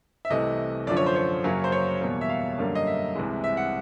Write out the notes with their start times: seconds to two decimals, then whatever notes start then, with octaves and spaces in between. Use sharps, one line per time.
0.25 E5
0.30 C2 C3 E3 A3 D#5
0.87 F#2 D3 F3 D5
0.97 C#5
1.06 C5
1.16 C#5
1.44 F#2 C#3 F#3 A#3
1.64 C5
1.72 C#5
2.01 E2 B2 G3 A#3
2.21 E5
2.29 F5
2.58 F#2 D3 G3 A#3
2.75 D#5
2.87 E5
3.15 C2 C3 E3 G#3
3.44 E5
3.57 F#5